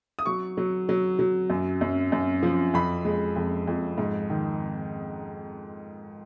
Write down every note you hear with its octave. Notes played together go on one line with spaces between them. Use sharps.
D#6
F#3 C#6
F#3
F#3
F#3
F#2
F#2
F#2
F3
F2 B5
G#3
F2
F2
G#2
D#3